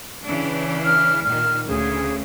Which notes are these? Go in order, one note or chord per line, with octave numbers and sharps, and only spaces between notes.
C#3 E3 D4
F6
A#2 D#3 F6
D2 C#3 G#4